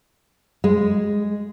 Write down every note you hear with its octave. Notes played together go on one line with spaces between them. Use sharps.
G#3